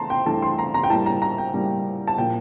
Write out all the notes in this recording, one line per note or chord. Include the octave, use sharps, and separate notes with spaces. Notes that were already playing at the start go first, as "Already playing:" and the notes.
Already playing: E3 A3 A5 A#5 C6
G5
G2 E3 A3 A5
C6
A#5
A#5
G5
A2 G3 A#3 A5
A#5
A#5
G5
A2 G3 A#3
A5
A#2 F3 A#3 G5